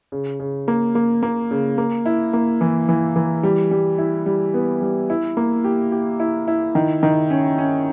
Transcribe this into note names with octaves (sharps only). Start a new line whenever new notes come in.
C#3
C#3
A#3
A#3
A#3
C#3
A#3
E4
A#3
E3
E3
E3
G3
G3
E4
G3
B3
G3
E4
A#3
G4
G4
E4
E4
D#3
D#3
C#4
C#4